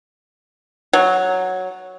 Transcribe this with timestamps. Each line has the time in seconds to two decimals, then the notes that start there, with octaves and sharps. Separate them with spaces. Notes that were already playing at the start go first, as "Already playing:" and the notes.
0.93 F#3